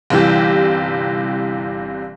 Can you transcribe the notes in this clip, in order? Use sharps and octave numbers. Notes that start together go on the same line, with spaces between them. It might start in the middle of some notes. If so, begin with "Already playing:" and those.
G1 C3 E3 G3 G4